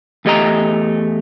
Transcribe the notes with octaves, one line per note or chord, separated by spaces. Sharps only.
E2 A3 G4 D#5 G5 A#5